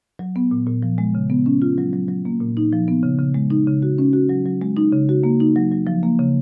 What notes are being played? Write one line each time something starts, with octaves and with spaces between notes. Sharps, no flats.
F#3
B3
A#2
A#2
F3
G#3
C#3
B3
C#4
F4
F#3
F#3
F#3
A#3
A#2
D#4
F3
B3
C#3
C#3
G#3
D#4
C#3
F#4
C#4
F#4
F#3
F#3
G#3
D#4
C#3
F#4
A#3
D#4
F#3
F#3
F3
A#3
C#3